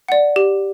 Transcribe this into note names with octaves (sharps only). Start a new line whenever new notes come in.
D5 F#5
G4